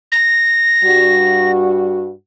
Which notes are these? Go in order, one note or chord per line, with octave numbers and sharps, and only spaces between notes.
A#6
G2 G3 F#4